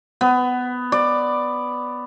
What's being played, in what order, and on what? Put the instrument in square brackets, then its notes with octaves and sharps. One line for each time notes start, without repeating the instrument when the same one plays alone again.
[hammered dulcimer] B3
D5